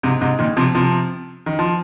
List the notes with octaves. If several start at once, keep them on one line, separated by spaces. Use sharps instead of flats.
G#2 C3
G#2 C3
A#2 D#3
C3 F3
C3 F3
D#3
F3